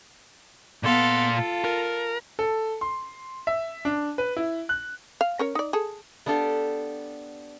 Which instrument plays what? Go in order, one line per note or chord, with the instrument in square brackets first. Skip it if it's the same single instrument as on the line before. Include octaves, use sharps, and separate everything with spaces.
[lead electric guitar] A#2 C6 [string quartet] B3 A4 F5
[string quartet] F4 A4
[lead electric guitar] A#4
[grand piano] A4
C6
E5
D4
B4
E4
F#6
[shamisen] F5
C#4 A#4 C#5
D#4 D5
G#4 A4
[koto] B3 D4 G4 A4 F5